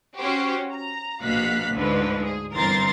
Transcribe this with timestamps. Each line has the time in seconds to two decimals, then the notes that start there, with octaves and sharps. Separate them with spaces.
0.18 C#4 F#4 G4 C5
0.71 A#5
1.23 A#1 B2 A#3 F5 F#6 B6
1.76 D2 G#2 D3 F3 B4
2.23 G#4
2.53 G1 E3 C4 A#4 C6 A6